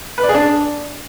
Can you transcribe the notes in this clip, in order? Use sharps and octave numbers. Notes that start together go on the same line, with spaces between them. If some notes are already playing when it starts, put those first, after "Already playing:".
B4
D5
G#4
D4